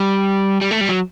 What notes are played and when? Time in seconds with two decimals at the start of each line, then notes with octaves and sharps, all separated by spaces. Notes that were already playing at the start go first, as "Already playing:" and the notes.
Already playing: G3
0.61 G3
0.71 A3
0.81 G3
0.89 F#3